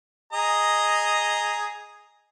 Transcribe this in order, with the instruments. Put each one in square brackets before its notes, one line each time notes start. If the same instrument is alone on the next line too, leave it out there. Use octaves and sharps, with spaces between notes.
[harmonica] G#4 D#5 A#5